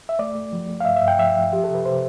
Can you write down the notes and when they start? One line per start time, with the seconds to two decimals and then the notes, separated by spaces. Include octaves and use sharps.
0.09 E5
0.19 A3 D5
0.35 A3
0.52 F3
0.69 A3
0.80 F5
0.85 G2 E5
0.96 E5
1.02 G2
1.08 G5
1.19 F3 E5
1.36 F3
1.51 F3 G4
1.64 C3 A4
1.74 B4
1.85 C3 C5